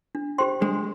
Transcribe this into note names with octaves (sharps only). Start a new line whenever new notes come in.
D4
G4 C5 G5 C6
G#3 D4